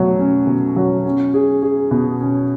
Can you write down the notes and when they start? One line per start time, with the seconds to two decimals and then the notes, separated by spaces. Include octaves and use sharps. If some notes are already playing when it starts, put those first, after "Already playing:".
Already playing: B2 F#3 A3
0.19 C#4
0.47 B2
0.76 F#3
1.05 C#4
1.34 G#4
1.63 G#4
1.91 B2
2.21 C#4